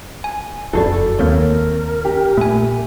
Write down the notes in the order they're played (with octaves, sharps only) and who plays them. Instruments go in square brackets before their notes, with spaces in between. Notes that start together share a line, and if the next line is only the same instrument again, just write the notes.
[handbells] G#5
[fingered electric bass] F1 F#2 [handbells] E4 F#4 D5 [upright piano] A4
[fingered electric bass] D#2 [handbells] A#3 C4 C#5 [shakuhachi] A#4
[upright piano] G4
[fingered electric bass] A#2 [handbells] A3 G#5